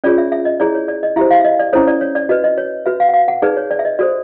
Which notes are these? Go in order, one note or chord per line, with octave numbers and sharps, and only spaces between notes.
C#4 F4 G#4 C#5 D5
E5
E5
D#5
E4 G#4 C#5 D5
C#5
D5
D#5
E4 G4 C5 E5
F5
E5
D#5
D5
C#4 E4 A4 C5 C#5
D5
C#5
D5
F#4 B4 D#5
D#5
C#5
F#4 B4 E5
F5
F#5
F5
F#5
D#4 G#4 B4 D5
C#5
D5
E5
D#5
F#4 A4 C5 D5